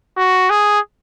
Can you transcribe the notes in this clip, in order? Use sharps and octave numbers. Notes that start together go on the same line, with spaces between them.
F#4
G#4